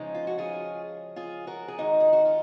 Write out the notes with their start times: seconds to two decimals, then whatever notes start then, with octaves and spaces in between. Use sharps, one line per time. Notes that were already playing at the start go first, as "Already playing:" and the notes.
Already playing: C#3 F3 G#3 C#4 D#4
0.15 F4
0.27 F#4
0.38 F4 G#4
1.16 F4 G#4
1.47 F#4 A#4
1.68 G#4
1.78 G#2 D#3 G#3 D#4 F#4
2.00 G#4
2.13 F#4
2.25 F4